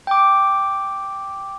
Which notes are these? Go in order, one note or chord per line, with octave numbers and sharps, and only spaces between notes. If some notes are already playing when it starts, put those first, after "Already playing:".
G5 D6